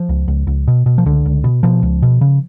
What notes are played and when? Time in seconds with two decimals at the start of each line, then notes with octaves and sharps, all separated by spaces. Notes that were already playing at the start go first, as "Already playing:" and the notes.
Already playing: F3
0.09 C#2
0.28 C#2
0.47 C#2
0.67 B2
0.86 B2
0.98 F3
1.06 C#2 D3
1.26 C#2
1.44 B2
1.63 B2 F3
1.82 C#2
2.02 B2
2.21 C#3